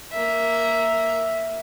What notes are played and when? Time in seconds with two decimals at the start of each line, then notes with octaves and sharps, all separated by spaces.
0.12 A#3 E5